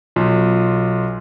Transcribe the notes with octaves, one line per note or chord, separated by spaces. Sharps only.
B1 F4